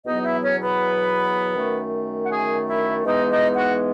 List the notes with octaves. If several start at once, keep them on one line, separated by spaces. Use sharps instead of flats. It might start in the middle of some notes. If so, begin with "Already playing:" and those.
E2 B2 F#3 B3 D#4 D#5
E4 E5
C#4 C#5
B3 B4
F#2 D#3 A3
F#5
G#4 G#5
E4 E5
G#2 E3 G#3 B3 D#4 D#5
D#4 D#5
F#4 F#5